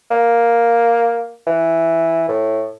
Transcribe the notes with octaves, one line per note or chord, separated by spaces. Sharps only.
A#3
E3
A2